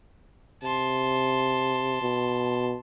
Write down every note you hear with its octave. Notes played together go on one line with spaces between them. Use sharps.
C3 A5 C6
B2